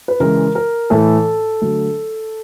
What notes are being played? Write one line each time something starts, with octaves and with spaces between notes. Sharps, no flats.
B4
C#3 E3 G#3 A#4
A#4
A2 E3 A3 A4
D3 F#3 A3